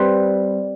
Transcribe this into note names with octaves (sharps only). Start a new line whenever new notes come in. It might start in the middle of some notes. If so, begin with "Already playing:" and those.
Already playing: G3 C4 G4 B4